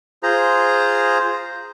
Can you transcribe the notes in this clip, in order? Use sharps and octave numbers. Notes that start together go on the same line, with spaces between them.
F4 G#4 C5 A#5